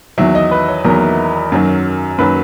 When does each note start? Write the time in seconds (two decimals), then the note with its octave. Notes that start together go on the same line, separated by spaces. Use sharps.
0.18 E2 D#3 F#3 E5
0.35 D#5
0.51 B4
0.69 C#5
0.84 E2 D#3 F#3 A#4
1.52 F#2 D#3 F#3
2.18 F#2 D#3 F#3 B4